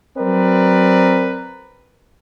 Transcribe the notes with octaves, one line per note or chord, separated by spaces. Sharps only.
F#3 C4 A#4 B4 D5